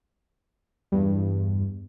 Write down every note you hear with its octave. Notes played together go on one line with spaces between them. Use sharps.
E2 G2